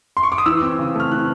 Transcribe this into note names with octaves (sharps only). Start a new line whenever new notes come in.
C6
C#6
D6
D#6
E3 E6
C4
C#3
A3 F6
E3 F#6